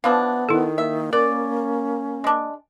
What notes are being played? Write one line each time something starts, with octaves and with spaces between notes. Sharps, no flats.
E3 F3 B3 D4 F5
D#3 E4 A4
A#3 E5
C#4 A#4 D5
G#3 D4